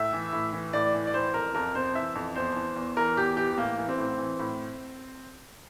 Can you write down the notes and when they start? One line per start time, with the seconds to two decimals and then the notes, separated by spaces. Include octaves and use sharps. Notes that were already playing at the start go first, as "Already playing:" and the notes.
Already playing: A2 E5
0.13 E3
0.33 A2
0.53 E3
0.73 A2 D5
0.94 E3
1.07 D5
1.14 E3 C5
1.34 F2 A#4
1.54 F2 A#4
1.75 C3 C5
1.95 E3 E5
2.15 F2
2.36 E2 C5
2.56 E3
2.76 E2
2.96 E3 A#4
3.17 E2 G4
3.37 E3 G4
3.57 A2 A#3
3.78 E3
3.88 C4
3.98 A2
4.18 E3
4.39 A2